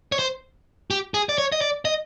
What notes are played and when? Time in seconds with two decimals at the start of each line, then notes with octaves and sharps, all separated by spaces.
0.12 C#5
0.19 C5
0.91 G4
1.14 G#4
1.29 D5
1.38 C#5
1.52 D#5
1.61 D5
1.85 D#5